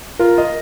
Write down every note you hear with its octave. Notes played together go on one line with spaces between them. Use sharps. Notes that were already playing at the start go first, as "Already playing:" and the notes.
F4 A#4
D#5